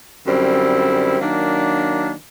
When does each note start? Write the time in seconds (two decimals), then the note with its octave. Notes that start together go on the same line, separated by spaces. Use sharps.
0.25 F#2 D3 G3 C4 E4
1.19 D#3 F#3 A#3 D4